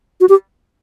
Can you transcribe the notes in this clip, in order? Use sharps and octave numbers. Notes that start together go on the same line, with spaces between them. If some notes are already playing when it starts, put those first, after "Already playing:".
F#4
G4